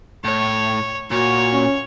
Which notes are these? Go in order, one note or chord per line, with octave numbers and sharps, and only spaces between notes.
A2 C#5
A#2 F#4 C#5
C#4